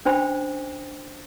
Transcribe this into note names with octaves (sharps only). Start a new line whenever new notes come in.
C#4 D4 C5 G5 B5